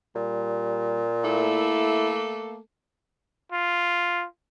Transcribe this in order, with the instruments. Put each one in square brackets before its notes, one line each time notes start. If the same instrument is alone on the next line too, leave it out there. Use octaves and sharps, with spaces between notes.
[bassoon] A#2 [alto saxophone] G3
[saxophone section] A3 A#3 A4 [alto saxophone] E4
[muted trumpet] F4